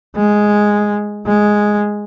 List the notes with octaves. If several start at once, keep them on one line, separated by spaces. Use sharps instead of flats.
G#3
G#3